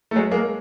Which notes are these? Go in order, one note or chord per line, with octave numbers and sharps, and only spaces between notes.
A3
F#3 G#3
G#3 A#3